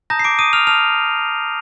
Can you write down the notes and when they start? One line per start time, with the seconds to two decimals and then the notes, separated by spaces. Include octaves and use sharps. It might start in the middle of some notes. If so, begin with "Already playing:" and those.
0.10 A5 A#5 D#6 G6 A#6
0.19 C7
0.24 D6 D7
0.39 D#6 D#7
0.53 F6 F7
0.67 A5 D#6 F6 F7